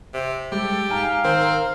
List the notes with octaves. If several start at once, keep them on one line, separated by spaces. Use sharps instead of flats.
C3
G3 G#3 G4 A4
G#2 F5 G5 G#5 A#5
D#3 C4 A#4